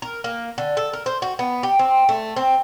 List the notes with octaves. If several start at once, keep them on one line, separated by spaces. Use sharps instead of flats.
A#4
A#3
D3
A4
A#4
C5
F#4
B3
G4
C4
A3
C4